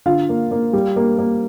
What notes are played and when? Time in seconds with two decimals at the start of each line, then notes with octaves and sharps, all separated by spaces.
0.06 D3 F4 F5
0.29 A#3
0.51 A#3
0.73 G3
0.96 A#3
1.18 A#3